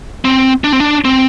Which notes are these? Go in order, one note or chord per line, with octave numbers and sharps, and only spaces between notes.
C4
D4
C4
D4
C4